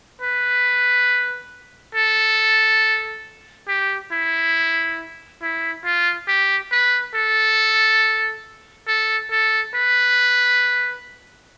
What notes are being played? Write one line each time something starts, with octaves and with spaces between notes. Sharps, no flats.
B4
A4
G4
E4
E4
F4
G4
B4
A4
A4
A4
B4